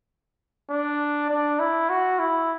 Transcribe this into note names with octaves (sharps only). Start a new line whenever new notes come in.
D4
D4
E4
F#4
E4